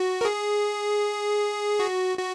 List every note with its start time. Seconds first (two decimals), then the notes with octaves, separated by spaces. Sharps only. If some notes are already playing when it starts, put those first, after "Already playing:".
Already playing: F#4
0.21 A#4
0.25 G#4
1.79 F#4
2.18 F#4